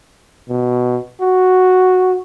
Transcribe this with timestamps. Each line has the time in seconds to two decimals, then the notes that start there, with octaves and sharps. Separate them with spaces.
0.49 B2
1.21 F#4